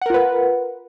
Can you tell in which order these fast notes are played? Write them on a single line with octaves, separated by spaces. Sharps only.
F#5 A#4 F4 B4